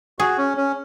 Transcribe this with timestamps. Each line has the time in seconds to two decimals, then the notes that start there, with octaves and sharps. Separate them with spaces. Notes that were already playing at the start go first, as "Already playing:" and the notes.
0.19 F#4 G#4
0.38 C#4
0.57 C#4